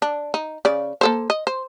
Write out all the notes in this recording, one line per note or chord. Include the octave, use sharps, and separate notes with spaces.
D4
D#4
C#3 D5
A#3 A4 C5
D#5
C5